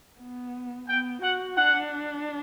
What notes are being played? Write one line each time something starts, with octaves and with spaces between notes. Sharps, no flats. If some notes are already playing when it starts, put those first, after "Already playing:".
B3
B3 G5
F#4 F#5
D4 F#5